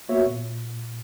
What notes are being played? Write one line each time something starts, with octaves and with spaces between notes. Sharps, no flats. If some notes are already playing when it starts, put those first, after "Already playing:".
A#3 B3 F#4 C#5 E5
A#2